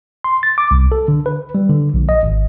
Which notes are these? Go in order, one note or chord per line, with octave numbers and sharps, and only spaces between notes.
C6
A6
D6
C2
A4
D3
B4
G3
D3
A#1
D#5
G#1